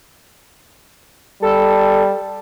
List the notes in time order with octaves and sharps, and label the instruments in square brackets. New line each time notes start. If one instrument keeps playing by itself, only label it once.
[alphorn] G3 [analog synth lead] A4